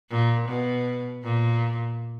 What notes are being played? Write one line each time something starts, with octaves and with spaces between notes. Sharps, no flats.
A#2
B2
A#2